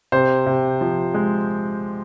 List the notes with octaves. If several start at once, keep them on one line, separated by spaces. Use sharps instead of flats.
C3 C5
C3
F3
G#3